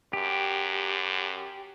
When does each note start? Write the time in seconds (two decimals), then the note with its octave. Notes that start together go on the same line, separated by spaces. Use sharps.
0.13 F#2 G4